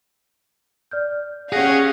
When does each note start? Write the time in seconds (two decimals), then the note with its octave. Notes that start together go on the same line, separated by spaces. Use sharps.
0.91 D5 F6 G6
1.53 C#4 G4 G#4 F5 F#5 A#6